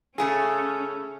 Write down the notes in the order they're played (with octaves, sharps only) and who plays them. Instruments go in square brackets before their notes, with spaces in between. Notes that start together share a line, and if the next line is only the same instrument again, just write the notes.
[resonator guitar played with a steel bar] C#3 A3 G#4 [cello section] C#4